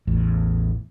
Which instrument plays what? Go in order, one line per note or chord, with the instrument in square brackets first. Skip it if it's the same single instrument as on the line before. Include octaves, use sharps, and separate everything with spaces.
[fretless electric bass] A1 E2 A2